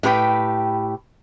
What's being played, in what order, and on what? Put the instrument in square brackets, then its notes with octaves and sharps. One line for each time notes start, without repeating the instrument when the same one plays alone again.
[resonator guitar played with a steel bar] A2 G4 B4 G5